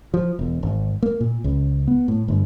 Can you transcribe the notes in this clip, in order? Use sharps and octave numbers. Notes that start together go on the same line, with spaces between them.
F3
E1
G#1
A#3
A#2
C#2
B3
A2
G1